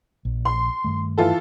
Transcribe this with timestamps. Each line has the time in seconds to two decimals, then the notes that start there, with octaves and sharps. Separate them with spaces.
0.25 A#1
0.45 C6
0.84 G2 D#3 A3
1.18 E3 F4 A4